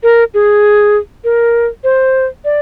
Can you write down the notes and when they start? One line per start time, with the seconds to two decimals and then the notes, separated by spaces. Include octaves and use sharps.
0.03 A#4
0.34 G#4
1.24 A#4
1.84 C5
2.45 D5